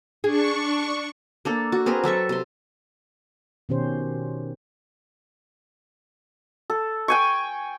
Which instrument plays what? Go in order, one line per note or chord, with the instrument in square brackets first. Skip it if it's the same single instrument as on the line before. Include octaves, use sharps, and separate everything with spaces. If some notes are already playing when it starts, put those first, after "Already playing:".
[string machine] D4 C#6 [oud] G#4
[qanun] A#3 D4 A4
F#4
C4 G#4 A#4 B4
F#3 A4 E5 C#6
C3 C6
[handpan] B2 D#3 C#4 G4 C5
[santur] A4
G5 G#5 C#6